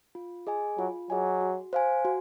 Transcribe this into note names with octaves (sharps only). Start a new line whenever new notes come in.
F4
G#4 D#5 G#5
F#3 F4
F#3 G#4 D#5 G#5
F#4
C5 F5 G#5
F#4